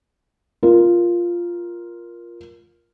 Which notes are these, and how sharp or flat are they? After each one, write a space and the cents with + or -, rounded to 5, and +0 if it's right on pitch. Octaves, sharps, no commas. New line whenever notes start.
F4 -5 A#4 +15